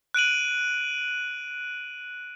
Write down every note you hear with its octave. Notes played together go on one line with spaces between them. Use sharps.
F#6 D7 D#7 F#7